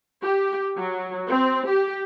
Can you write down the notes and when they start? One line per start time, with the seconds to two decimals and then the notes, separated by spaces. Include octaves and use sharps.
0.24 G4
0.76 F#3
1.29 C4
1.67 G4